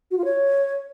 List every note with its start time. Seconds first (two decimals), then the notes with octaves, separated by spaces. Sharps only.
0.11 F#4
0.18 F4
0.25 C#5